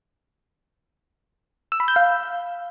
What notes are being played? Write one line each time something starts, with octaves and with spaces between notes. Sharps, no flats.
E6
B5
G6
F5